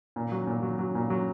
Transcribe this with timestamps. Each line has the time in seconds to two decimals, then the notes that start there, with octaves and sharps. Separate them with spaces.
0.16 A#2
0.32 F#3
0.47 A#2
0.62 F#3
0.79 F#3
0.95 A#2
1.10 F#3